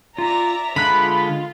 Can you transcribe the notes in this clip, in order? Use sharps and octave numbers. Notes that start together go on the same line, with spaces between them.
F4 D5 E5 A#5
D3 G#3 F4 B5 F#6